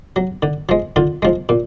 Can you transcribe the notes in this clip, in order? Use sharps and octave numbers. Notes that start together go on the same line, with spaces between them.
F#3
D3
F3 G#3
D3 F4
F3 G#3
A#2